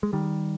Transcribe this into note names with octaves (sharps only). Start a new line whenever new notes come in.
G#3
D#3 G3